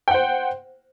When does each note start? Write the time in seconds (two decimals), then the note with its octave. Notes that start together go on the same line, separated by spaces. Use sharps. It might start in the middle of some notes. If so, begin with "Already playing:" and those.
0.08 G5
0.11 F#5
0.14 C5